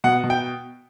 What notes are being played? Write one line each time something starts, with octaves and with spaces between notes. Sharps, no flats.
B2 F#5
B2
G5